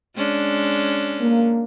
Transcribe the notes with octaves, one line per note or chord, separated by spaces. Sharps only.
G#3 C#4 D4
A#3